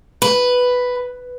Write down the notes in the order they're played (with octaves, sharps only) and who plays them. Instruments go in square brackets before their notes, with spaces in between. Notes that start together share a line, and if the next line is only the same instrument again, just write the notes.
[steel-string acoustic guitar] B4